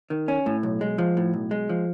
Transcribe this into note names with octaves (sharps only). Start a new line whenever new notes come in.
D#3
C#4
A2
B1
G#3
F3
A2
B1
G#3
F3